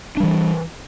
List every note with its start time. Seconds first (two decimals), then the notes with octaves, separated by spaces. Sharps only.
0.17 D4
0.20 G3
0.23 E3